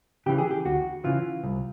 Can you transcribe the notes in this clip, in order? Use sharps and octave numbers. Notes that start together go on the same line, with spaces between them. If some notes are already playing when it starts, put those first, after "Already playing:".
C#3 E3 G4
G#4
G4
D2 F#4
C#3 E3 F4
C2